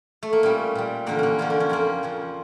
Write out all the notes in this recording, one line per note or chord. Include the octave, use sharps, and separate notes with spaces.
A3
A#3
A#2 G3 C#4
A#2 G3
E2 D3 F3 A#3
A#3 C#4
E2 D3 F3 C#4
D4
C#4
F2 C#3 F3 A#3
F2 C#3 F3